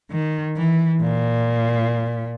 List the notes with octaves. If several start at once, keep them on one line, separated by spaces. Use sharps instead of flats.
D#3
E3
A#2